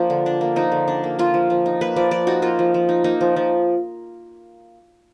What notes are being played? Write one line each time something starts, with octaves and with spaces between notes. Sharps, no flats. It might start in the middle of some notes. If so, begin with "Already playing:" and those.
Already playing: F3 A#3 D4 F4
D3
D4
A#3
F3 D#4
D3
D4
A#3
A#3 F4
F3
F3
D#4
A#3 B4
F3 D5
F3 D5
D#4 F#4
A#3 F4
F3
F3
D#4
A#3 D#4
F3
F3